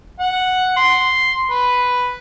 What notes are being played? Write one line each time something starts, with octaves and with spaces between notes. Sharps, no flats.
F#5
C6
B4